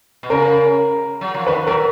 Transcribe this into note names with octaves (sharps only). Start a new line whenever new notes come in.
B2
C#3 A#4
F#3
F3
D#3 B4
F#3 A#4